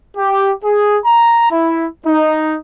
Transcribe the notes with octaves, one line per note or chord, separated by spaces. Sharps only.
G4
G#4
A#5
E4
D#4